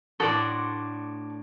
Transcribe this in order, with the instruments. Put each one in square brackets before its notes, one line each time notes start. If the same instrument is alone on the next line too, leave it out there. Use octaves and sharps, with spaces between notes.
[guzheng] A2 D4 F#4 [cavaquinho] A4 D5 C6